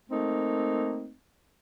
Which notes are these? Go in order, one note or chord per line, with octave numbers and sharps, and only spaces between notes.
A3 A#3 C4 D#4